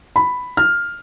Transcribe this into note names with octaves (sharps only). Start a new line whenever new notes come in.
B5
F6